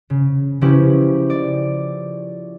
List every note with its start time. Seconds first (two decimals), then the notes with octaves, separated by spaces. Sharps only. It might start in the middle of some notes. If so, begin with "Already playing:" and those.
0.10 C#3
0.61 C#3 F3 C#4 E4 G4 B4
1.30 D5